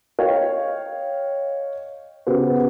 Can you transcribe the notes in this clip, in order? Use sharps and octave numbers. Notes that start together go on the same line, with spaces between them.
C#5 D#5 F5 G5
C#3 B3 F#4 G4 B4 C5